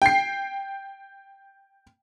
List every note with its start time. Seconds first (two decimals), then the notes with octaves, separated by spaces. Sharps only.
0.02 G5 C7